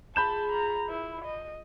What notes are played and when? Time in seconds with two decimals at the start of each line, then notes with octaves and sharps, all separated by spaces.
0.16 F4 G#4 A5 B5 G6 E7
0.52 A#5 C#6 F6 A6
0.89 E4 B4
1.24 D#5